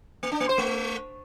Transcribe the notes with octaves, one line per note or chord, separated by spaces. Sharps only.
A#3
D4
A#3
C5
A3